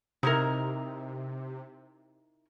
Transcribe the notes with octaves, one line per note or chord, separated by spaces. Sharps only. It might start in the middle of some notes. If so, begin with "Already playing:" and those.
C3 D#4 E4 A#4